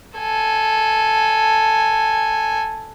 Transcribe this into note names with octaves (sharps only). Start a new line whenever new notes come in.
A4 G#5